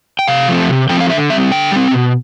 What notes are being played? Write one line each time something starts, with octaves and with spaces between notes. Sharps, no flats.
G5
C3 F5
F3 A3 C4
C3
F3 A3 C4 G5
F5
D3 E5
G3 C4 E5
D3 G5
G3 C4
B2